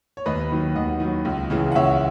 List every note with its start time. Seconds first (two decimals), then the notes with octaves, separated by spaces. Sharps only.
0.17 C#5
0.26 D#2 B4 D#5
0.51 D#3 F#3
0.75 D#2 D#5 F#5
1.00 D#3 F#3
1.25 C#2
1.50 C#3 E3
1.72 F#5
1.75 C#2 C#5 E5